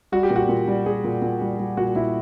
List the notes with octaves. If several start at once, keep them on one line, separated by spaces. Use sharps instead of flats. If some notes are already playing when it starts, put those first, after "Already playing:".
G3 F#4
G4
A#2
F#4
A#2
G3
G3 G#4
A#2
A#2
G3
G3
A#2 F#4
A#2 E4